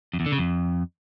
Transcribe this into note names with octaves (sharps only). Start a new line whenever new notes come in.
F2
E2
D3
C#3
F2